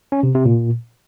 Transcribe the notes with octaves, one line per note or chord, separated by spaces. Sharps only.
C#4
C3
C3
A#2